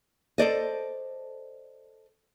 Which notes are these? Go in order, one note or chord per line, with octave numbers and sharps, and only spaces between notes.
A4 C5 D5 D#5